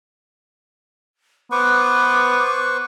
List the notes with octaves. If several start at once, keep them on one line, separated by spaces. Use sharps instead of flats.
B3 B4 C5 C#6 D6